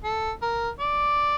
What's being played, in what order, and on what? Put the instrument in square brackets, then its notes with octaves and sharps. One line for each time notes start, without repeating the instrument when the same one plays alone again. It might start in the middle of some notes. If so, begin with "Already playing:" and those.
[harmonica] A4
A#4
D5